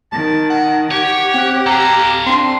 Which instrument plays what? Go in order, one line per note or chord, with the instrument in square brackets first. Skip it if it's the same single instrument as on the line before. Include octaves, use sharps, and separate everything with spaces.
[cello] D#3 [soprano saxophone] A5
[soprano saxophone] F#5
[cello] G4 [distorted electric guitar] C#5 [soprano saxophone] F#5
[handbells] C4 F#6
[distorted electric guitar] A4 F5 [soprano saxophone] A#5 [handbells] G#6
[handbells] C4 D4 [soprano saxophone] C6